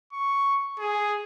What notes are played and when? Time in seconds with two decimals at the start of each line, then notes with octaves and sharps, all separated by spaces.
0.13 C#6
0.79 G#4